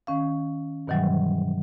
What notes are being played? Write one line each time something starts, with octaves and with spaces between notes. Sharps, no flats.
D#3 C#4 F5
G2 B2 D#3 E3 F#3 G3